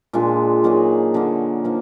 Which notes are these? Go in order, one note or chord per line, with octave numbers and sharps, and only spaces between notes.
A#2 G#3 D4 F4
F#3 A#3 D#4 G#4
D3 F#3 A#3
F3 A#3 D#4